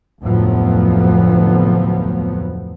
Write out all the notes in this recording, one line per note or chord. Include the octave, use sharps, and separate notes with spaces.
F1 D2 A2 F3 F#3 B3